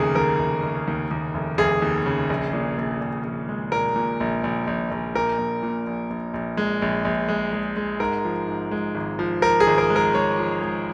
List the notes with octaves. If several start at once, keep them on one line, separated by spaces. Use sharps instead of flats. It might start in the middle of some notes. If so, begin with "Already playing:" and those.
Already playing: F1 D#2 C#3 G#4 A#4
D#2 A#4
F1
F1
D#2
D#2
F1
F1 G#4
D#2
C#3
A#1
A#2
A#1
A#1
A#1
G#3
A#2 A#4
A#2
A#1
A#1
A#1
A#1
A#2 A#4
A#1
A#2
A#1
A#1
A#1
G#3
A#1
A#1
G#3
G#3
G#3
G#2 A#4
F3
G#2
G#3
G#1
F3
F3 A#4
G#4
G#1
A#4
G#3
A#4
G#3 C#5
F3
G#3